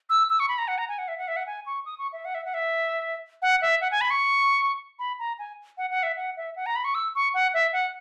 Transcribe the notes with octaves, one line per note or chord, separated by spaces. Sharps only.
E6
E6
C#6
B5
A#5
F#5
A#5
G#5
F#5
E5
F#5
E5
F#5
G#5
C#6
D#6
C#6
E5
F#5
E5
F#5
E5
F#5
E5
F#5
G#5
B5
C#6
B5
A#5
G#5
F#5
F#5
E5
F#5
E5
F#5
A#5
B5
C#6
E6
C#6
F#5
E5
F#5